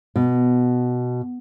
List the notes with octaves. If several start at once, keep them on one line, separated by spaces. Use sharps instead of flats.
B2